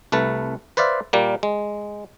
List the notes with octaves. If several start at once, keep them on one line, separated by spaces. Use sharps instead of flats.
C2 A3 B4 A5
B4 C5 D5 E5 F5
A#2 G3 A#3
G#3